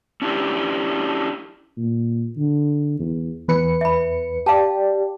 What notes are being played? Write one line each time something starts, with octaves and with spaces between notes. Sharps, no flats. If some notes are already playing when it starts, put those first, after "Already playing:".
C#4 D4 E4 F#4 G4
A#2
D3
E2
E2 B4 C#7
E5 B5
G4 D5 F5 A5